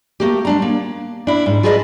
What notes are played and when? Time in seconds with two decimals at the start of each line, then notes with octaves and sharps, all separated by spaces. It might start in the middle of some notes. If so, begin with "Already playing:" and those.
0.20 A3 A#3 G4
0.45 G#3 D4 A#5
0.62 A#3
1.27 D4 E4
1.46 G#2
1.63 F4 G#4 A4 B4 D5 D#5